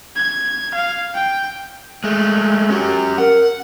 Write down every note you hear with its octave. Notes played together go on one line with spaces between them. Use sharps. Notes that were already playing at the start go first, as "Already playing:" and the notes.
G#6
F5
G5
G#3 A3
C#4 F#4 G4
A#4 F#5